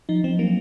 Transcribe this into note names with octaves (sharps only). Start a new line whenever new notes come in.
F3 D#4
F3 C4
F#3 A#3